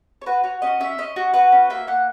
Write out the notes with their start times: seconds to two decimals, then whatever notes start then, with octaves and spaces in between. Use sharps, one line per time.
0.22 C#5
0.26 F#4 B4
0.44 F#4 C#5
0.62 C#4 D#5
0.80 C#4 E5
0.98 C#4 D#5
1.16 F#4
1.34 F#4 B4
1.52 C#4
1.70 A#3 E5
1.87 A#3 F#5